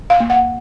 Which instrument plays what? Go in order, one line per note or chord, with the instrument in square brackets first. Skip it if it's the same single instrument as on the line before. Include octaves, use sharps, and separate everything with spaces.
[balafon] F5
A#3
F#5